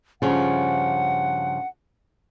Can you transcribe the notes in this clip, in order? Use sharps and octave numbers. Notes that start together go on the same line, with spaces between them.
G2 C#3 F3 F#5